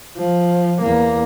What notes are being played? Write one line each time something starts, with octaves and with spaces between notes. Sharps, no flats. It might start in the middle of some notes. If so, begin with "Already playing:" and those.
F3
E2 A#3